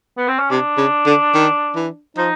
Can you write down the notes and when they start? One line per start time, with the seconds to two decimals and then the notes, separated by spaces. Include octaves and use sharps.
0.17 B3
0.28 C4
0.39 C#4
0.50 C3 D4
0.77 C#3
1.06 D3
1.34 D#3
1.76 E3
2.17 F3 D#4